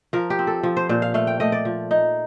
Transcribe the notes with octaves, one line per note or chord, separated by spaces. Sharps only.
F3 A#4
G4
C4
A4
F3
C5
A#2 C5
F5
A3 F5
G5
A3 D#5
D5
F3
D#4